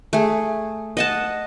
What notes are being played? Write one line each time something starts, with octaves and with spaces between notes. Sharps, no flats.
A3 G#4
D#5 F#5 A5